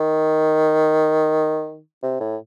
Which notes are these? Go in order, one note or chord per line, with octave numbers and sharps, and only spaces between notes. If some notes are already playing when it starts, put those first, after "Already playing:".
Already playing: D#3
C3
A2